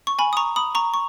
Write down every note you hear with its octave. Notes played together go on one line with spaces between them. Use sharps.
C#6
G#5 B5
D#6
A#5 C#6
B5 D#6
A#5 C#6
C#6